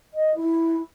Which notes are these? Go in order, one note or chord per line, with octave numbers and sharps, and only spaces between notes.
D#5
E4